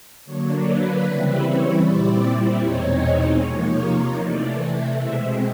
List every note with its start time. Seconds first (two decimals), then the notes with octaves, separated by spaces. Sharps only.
0.24 D3 F#3 A#3 D4 C#5
0.64 B4
1.03 C#3 E3 G3 C4 E4
1.43 C#5
1.82 A#2 G3 C4 E4 D5
2.61 E2 B2 G#3 C4 D#4 C#5
3.39 C3 F3 A#3 D#4 C#5
4.18 C3 E3 A3 D5
4.96 B2 G#3 C4 E5